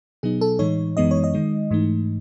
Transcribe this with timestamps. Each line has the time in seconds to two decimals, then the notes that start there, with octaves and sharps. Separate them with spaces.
0.23 B2 F#3 B3 D#4 G#4
0.41 A4
0.59 A2 E3 G#3 D#4 C#5
0.97 F#2 E3 G#3 B3 D#4 D#5
1.11 C#5
1.24 D#5
1.34 D#3 G#3 D#4
1.71 G#2 E3 A3 D#4